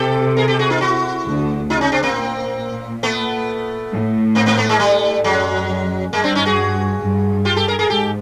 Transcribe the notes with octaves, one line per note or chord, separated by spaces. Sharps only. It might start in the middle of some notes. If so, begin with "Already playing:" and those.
Already playing: C3 G4 A4
G#4 A#4
G4 A4
F#4 G#4
D#4 F4
E4 F#4
D2 D3
C#3 D#4 F4
C#4 D#4
C4 D4
A#3 C4
A#2
A3 B3
A2
A#3 C4
A#3 C4
A3 B3
G#3 A#3
G3 A3
F#2 F#3 G#3
G2 G#3 A#3
C4 D4
C#4 D#4
F#4 G#4
G2
F4 G4
G4 A4
G#4 A#4
G#4 A#4
G#2 G4 A4